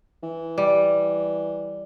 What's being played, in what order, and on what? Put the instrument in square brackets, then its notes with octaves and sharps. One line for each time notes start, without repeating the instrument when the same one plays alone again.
[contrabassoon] E3
[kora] G3